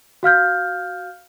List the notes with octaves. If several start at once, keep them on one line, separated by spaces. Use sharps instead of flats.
F#4 F5 F6 G6